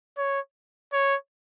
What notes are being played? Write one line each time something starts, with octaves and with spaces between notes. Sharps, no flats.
C#5
C#5